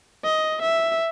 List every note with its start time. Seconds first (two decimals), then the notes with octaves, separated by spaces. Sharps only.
0.24 D#5
0.62 E5